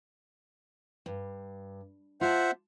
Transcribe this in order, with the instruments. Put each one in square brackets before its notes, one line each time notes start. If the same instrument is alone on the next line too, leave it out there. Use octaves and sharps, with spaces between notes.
[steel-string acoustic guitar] G2
[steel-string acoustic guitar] F4 D5 A5 [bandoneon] C5 E5 F#5